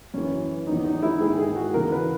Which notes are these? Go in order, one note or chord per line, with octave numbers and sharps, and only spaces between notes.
F#2 E3 C#4
E2 D#3 D#4
D#4
E4
G#2 D#3 G#4
G#4
F#4
E2 C#3 E3 A#4
B4